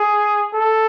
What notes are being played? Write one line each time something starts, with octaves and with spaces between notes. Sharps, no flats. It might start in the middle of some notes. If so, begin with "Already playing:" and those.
Already playing: G#4
A4